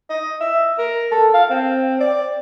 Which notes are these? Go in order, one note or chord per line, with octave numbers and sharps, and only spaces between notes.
D#5
E5
A#4
A4
F5
C4
D5